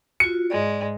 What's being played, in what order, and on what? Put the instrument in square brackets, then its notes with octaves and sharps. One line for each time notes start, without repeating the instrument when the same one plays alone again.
[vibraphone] F4 F#4 [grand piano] C#7
[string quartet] G#2 G#3 [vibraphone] D5